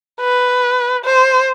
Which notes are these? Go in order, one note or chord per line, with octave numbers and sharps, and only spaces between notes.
B4
C5